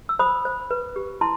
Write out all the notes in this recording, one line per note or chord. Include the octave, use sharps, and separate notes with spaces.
E6
C5 B5 D#6
C5
B4
G4
E4 A5 C6